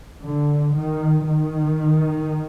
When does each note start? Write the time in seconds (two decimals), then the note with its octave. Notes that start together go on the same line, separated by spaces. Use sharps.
0.23 D3
0.74 D#3
1.25 D#3